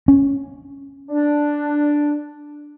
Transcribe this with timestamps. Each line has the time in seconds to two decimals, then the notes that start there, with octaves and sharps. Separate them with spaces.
0.08 C#4
1.10 D4